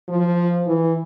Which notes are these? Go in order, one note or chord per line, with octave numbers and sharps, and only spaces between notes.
F3
E3